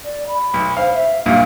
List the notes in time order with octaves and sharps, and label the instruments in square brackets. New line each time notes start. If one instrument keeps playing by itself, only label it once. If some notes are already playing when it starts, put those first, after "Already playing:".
[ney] D5
B5
[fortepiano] B1
[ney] C5 [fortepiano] F5
[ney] E5
[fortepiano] B1 G2 A#2 [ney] F5